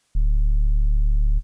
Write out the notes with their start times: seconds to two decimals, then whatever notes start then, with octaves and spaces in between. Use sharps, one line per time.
0.15 D1